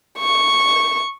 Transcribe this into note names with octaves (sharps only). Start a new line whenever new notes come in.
C#6